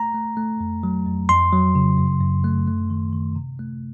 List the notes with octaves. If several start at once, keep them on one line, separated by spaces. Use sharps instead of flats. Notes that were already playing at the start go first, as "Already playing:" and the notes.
Already playing: A3 A#5
A3
A3
F2
F#3
F2
F2 C6
F#3
C#3
F#2
F#2
A3
A3
D#3
D#3
C3
A3